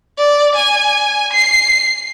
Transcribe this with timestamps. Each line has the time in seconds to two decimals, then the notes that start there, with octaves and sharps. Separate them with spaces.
0.18 D5
0.55 G#5
1.33 C7